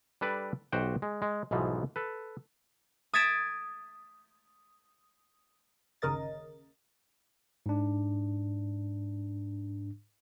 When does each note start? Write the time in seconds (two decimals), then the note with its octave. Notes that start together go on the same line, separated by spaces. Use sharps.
0.21 G3 D4 A4 B4 D5
0.72 B1 F#4 G4 C5 F#5 G5
1.02 G#3
1.22 G#3
1.51 B1 G#2 B2 E3 F3
1.96 A4 B4
3.14 D#6 G#6 A6 B6 D7 E7
6.02 G1 D#2 C#3 A#4 D#5 A6
7.66 G#2 D4